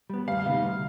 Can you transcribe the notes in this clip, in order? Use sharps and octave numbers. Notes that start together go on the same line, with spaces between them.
G3 B3
D2 F5
C3 G3 B3 D#4
D2